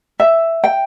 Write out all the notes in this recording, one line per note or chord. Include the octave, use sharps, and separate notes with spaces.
E5
G5